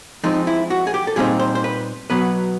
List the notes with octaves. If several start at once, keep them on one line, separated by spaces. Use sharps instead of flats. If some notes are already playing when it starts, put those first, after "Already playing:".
F3 G#3 C4 D#4
E4
F#4
G#4
G4
A4
A#2 G3 C4 D#4 G#4
C5
C5
B4
B2 F#3 B3 B4